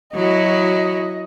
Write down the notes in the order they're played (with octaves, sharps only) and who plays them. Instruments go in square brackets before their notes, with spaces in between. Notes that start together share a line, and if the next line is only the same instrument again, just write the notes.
[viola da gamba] F#3 E4 F#4 [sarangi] D#5